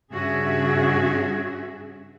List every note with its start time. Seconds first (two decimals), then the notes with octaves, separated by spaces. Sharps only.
0.11 G2 C#3 F#4 G#4 E5